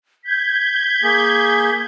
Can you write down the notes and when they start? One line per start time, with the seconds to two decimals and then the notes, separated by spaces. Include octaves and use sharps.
0.25 G6 G#6 B6
1.03 A#3 G#4